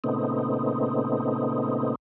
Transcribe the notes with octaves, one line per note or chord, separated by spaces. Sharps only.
A#2 C#3 A3 B3 C4 D#4